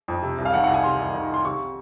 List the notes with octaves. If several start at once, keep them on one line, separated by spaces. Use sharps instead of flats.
F2
C3
C2
F5
D#3 F#5
C2 F#5
G#5
C3 C6
C2
D#3
C2 C6
C3 C#6